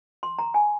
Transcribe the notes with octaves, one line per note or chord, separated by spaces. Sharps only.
C6
A#5
G#5